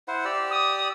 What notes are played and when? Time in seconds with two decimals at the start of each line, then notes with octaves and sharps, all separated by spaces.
0.08 E4 C5 F#5
0.25 G4 D5 E6
0.50 D#6